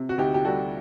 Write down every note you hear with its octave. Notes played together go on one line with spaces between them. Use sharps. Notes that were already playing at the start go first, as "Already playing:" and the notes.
Already playing: C3 C4
F#4
D2 D#4 G4
G4
G3 F#4 A4